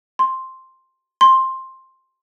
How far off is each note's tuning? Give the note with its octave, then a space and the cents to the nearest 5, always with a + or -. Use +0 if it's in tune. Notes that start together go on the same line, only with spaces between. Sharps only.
C6 +5
C6 +10